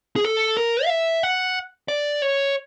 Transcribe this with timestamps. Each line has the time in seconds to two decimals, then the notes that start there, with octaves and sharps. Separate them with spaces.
0.16 G#4
0.24 A4
0.57 A#4
0.85 F5
0.90 E5
1.23 F#5
1.88 D5
2.22 C#5